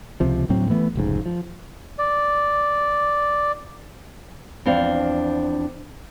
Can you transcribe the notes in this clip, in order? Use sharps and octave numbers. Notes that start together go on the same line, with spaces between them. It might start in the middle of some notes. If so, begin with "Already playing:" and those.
C#2 C3 F3
D2 A2 F#3 C4
E3 A3 B3
F1 C#2 G#2
F3
D5
E2 F3 C4 D4 F5